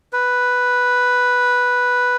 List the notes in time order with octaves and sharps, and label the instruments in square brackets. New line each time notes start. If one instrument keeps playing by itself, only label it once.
[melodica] B4